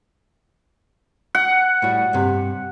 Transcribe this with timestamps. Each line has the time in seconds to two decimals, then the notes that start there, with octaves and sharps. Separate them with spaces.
1.35 F#5
1.82 A2 G3 F#4
2.13 G2 C3